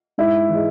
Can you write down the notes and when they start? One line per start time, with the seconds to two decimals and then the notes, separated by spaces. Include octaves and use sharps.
0.18 G#2 E4
0.49 E3 G#3